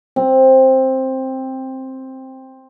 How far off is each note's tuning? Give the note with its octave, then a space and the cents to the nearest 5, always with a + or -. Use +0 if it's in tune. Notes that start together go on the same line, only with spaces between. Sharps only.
C4 +10